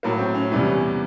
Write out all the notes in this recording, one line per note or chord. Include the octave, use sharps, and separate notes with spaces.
A2 F#3 A#3
C4
C#4
E2 C3 E3 G3 C#4